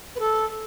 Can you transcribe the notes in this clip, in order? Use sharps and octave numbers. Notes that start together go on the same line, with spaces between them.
B4
A4